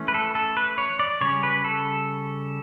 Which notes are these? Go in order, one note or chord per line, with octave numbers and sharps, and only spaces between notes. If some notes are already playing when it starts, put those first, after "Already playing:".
Already playing: E3 A3 C#4
B4
A4
A4
B4
C#5
D5
C#3 G3 C#4 C#5
B4
A4